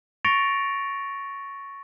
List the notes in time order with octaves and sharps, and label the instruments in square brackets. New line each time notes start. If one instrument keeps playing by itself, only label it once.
[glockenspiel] C#6 A6 A#6 C#7 D7 F7